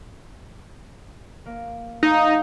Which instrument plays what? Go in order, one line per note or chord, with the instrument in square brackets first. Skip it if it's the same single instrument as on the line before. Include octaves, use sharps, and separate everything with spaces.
[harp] A#3
[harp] A3 F4 F5 [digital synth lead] D#4